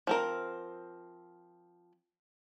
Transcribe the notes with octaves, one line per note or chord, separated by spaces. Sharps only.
F3 C4 A#4